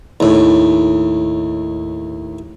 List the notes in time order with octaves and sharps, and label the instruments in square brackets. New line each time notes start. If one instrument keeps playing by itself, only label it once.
[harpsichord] D#2 A2